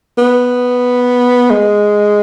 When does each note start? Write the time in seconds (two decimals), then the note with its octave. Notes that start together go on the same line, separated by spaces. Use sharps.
0.18 B3
1.51 G#3